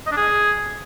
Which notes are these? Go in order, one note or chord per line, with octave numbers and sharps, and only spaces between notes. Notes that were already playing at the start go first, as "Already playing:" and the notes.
D#5
D4
G#4